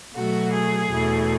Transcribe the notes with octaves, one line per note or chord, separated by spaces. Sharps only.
B2 F#3 A3 F#4
G#4
E2 B2 A3